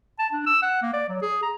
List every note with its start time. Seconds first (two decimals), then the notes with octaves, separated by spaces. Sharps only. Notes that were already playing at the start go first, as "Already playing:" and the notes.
0.19 A5
0.32 D4
0.46 E6
0.62 F#5
0.82 A#3
0.94 D5
1.09 F#3
1.22 G#4
1.43 A#5